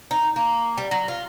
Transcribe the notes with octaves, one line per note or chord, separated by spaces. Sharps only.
D#4
A#3
G3
F#3
F4